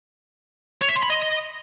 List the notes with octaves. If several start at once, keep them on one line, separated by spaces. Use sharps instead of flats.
C#5
E5
C6
B5
D#5